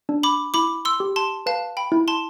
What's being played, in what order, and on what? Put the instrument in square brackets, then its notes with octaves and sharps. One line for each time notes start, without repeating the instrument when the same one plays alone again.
[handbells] D4
[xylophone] B5 D6
[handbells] E4 [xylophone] B5 D6
[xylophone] C6 E6
[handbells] G4
[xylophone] A5 C6
[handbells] B4 [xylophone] F5 A5
[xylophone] G5 B5
[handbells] E4
[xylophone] A5 C6